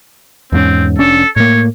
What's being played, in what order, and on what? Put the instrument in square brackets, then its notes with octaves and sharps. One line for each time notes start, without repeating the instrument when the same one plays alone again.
[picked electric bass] E2 G#2 C#4 [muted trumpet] C4
[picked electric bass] F1 C#4 D4 [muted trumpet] A4
[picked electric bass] A2 A#3 [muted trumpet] C#5